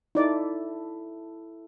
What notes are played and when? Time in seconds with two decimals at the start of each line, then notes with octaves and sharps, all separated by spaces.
0.15 D#4 E4 A4 D5